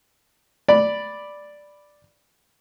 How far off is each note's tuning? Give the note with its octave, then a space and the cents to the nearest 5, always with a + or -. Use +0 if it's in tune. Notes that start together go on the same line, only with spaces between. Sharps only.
D5 +0 B5 +0